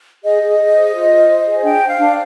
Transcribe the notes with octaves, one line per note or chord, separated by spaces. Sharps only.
G#4 D#5
G#4
G#4
C5
F4
C5
C5
G#4
D4 G5
C5
F5
D4